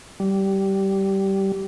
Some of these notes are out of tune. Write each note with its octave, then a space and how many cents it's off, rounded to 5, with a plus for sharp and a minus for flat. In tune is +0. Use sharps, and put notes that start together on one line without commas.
G3 -15